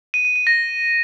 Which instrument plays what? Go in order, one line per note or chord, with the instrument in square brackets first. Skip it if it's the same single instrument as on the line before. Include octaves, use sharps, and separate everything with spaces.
[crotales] D#7
D#7
D#7
A#6